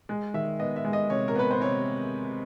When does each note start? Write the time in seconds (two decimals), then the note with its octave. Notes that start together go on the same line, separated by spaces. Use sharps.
0.09 G#3
0.34 D#3 E5
0.59 B3 D#5
0.76 E5
0.85 G#3
0.93 D#5
1.10 C3 C#5
1.28 A#4
1.36 B3 B4
1.51 C5
1.60 C3 C#5